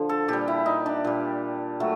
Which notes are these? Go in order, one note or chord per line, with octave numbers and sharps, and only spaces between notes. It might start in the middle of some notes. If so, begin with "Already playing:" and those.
Already playing: D3 F3
A4
A#2 G3 G4
E4
D#4
D4
A#2 G3
F#3 A3